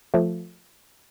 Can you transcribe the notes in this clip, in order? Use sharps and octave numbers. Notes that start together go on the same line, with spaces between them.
F3 A3